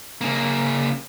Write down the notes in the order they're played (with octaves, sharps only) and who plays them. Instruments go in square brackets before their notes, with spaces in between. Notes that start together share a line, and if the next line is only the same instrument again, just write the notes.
[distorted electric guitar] C#3 A#3